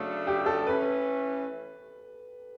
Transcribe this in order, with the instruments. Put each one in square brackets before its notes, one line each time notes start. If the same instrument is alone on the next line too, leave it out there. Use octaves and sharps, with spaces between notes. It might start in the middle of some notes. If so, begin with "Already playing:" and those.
Already playing: [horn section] C#3 F#3 A3 D4
[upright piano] G4
A4
[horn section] E3 A3 C#4 [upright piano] B4